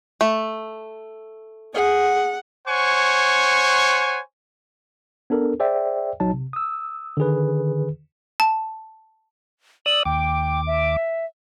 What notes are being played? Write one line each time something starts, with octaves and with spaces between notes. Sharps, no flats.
A3
G#4 F#5
C5 C#5 F#5 G#5 C#6
B3 D4 A4 A#4
G#4 C5 D5 E5 G5
A#1 F#3 D#4 A5
C3
D#6 E6
D3 D#3 G#4 B4
A5
D5 D#6 E6 F#7
D#2 G5 D6
E5